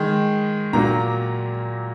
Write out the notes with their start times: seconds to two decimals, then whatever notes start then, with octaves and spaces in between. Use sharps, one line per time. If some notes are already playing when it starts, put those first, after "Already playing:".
Already playing: D#3 G#3
0.73 A#2 F#3 A#3 A#5